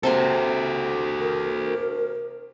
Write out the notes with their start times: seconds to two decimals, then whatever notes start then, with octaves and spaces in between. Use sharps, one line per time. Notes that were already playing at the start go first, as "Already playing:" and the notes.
0.03 C3 A#3 F#4 A4 C6
1.20 A#4